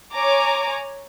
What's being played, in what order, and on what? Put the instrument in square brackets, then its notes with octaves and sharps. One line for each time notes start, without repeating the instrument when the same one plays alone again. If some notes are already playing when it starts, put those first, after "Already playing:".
[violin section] C#5 G#5 A#5 D6